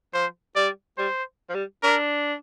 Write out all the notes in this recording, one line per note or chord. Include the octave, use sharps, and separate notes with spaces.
F3 C5
G3 D5
G3 C5
F3
G3
D4 A#4